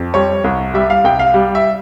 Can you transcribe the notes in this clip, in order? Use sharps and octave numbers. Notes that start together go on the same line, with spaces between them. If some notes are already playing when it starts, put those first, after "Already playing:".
Already playing: F2
G3 C#5
C2
G3 E5
F5
C2 G5
F5
G3
E5